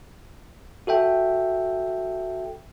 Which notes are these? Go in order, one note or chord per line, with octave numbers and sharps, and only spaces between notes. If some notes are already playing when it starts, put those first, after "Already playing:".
F#4 A4 E5 G5